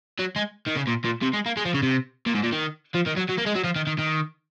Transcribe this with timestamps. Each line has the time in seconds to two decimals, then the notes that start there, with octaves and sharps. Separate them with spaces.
0.19 F#3
0.36 G#3
0.67 D#3
0.77 C#3
0.88 A#2
1.05 A#2
1.22 C3
1.34 G#3
1.46 A#3
1.57 G#3
1.65 F3
1.74 C#3
1.83 C3
2.26 A#2
2.35 G#2
2.43 A#2
2.52 D#3
2.95 F3
3.07 D#3
3.17 F#3
3.29 F#3
3.38 A#3
3.47 G#3
3.56 F#3
3.64 F3
3.76 D#3
3.87 D#3
3.99 D#3